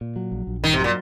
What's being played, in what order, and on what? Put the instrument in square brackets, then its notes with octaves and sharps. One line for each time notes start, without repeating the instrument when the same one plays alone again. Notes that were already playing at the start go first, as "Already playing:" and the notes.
[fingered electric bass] A#2
F#3
A#1
A#1
[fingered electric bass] G2 [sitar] D#3
[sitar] C3
[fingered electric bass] F#3
[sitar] A#2